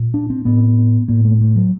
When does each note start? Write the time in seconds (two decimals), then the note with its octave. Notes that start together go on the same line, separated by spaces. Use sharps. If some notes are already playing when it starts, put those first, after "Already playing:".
Already playing: A#2
0.14 D4
0.30 C4
0.45 A2 B3
1.08 A2 A#3
1.25 A3
1.41 A3
1.56 F#3